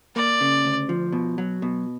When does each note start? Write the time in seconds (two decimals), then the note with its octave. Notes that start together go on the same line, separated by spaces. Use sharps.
0.16 A#3 D5
0.41 C#3
0.65 D2
0.89 F3
1.12 B2
1.38 F#3
1.62 B2